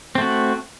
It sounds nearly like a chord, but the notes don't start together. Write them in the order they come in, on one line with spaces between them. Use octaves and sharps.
C4 A3 F#4